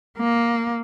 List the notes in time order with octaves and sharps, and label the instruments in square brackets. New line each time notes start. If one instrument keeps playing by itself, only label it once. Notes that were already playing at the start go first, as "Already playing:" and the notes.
[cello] A#3